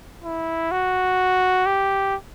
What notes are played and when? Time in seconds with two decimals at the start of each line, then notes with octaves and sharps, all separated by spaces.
0.24 E4
0.71 F#4
1.66 G4